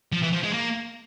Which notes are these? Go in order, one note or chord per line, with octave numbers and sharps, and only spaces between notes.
F3
E3
F3
G#3
A#3